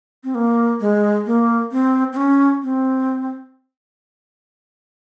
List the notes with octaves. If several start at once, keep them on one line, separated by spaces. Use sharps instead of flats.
C4
A#3
G#3
A#3
C4
C4
C#4
C4